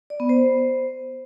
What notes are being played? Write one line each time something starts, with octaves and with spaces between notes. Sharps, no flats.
D5
B3
C5